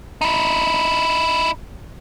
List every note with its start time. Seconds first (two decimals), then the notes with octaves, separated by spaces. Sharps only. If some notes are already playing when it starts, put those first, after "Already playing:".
0.21 D#4 E4